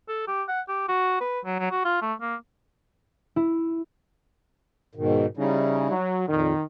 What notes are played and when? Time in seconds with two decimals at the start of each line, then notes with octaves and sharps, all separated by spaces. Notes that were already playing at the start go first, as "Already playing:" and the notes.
0.08 A4
0.27 G4
0.48 F#5
0.69 G4
0.88 F#4
1.21 B4
1.45 F#3
1.59 F#3
1.71 F#4
1.85 F4
2.02 A3
2.21 A#3
3.36 E4
4.95 G#2 B2 D#3
5.37 C#3 G3 D#4 E4
5.91 F#3
6.27 F2 A#2 D#3